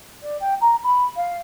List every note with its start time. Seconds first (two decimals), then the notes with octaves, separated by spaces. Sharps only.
0.23 D5
0.40 G5
0.61 A#5
0.84 B5
1.16 F5